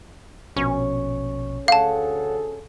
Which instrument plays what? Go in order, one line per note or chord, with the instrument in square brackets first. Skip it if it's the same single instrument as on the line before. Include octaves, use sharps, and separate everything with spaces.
[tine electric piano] A#1 B2 C#6 [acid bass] C#4
[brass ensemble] D2 G#4 A4 [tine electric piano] C#5 F#5 [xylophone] F5 A5